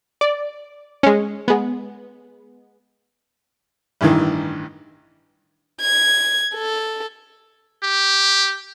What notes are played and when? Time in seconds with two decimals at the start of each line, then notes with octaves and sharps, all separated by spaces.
0.21 D5
1.03 G#3 C#4
1.48 G#3 B3
4.01 A1 G2 D#3 E3
5.81 G#6
6.55 A4
7.83 G4